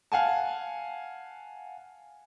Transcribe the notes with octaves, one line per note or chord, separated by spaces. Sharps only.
F5 F#5 G#5 A5